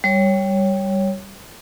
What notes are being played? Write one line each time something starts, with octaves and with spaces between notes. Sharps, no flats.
G3 C#5